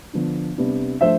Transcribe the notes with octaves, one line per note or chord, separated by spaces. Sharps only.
D3 F3 B3 D4
C3 G3 B3 D4
F3 A3 D4 C5 E5